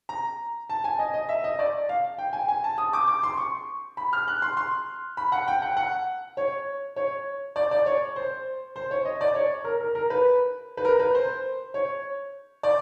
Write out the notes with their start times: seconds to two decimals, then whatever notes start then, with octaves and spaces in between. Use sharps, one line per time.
0.09 A#5
0.70 A5
0.84 G#5
0.99 D#5
1.14 D#5
1.29 E5
1.44 D#5
1.59 D5
1.89 F5
2.18 G5
2.33 G#5
2.48 G#5
2.64 A5
2.78 D#6
2.93 D6
3.08 D6
3.23 C6
3.37 C#6
3.97 B5
4.13 F6
4.28 F#6
4.42 C6
4.57 C6
5.17 B5
5.32 F#5
5.48 G5
5.62 F#5
5.77 F#5
6.37 C#5
6.96 C#5
7.56 D5
7.71 D5
7.86 C#5
8.16 C5
8.76 C5
8.91 C#5
9.05 D#5
9.21 D5
9.35 C#5
9.64 A#4
9.80 A#4
9.95 A#4
10.10 B4
10.77 B4
10.85 A#4
10.99 B4
11.15 C5
11.74 C#5
12.63 D5